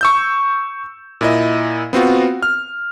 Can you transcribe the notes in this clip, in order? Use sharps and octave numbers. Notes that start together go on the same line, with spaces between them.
C#6 E6 G6
A#2 E4 D#5
B3 C4 F4 F#4
F6